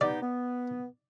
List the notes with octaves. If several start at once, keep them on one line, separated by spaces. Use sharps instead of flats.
B3 D#4 G4 D5
B3